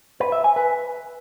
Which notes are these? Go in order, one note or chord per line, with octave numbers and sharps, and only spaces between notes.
B4
E5
G#5
B4